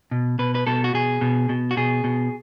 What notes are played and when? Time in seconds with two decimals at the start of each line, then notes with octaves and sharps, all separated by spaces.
0.11 B2
0.39 B2 B4
0.55 B4
0.67 B2 A4
0.84 F#4
0.94 B2 G#4
1.21 B2
1.49 B2
1.71 F#4
1.77 B2 G#4
2.04 B2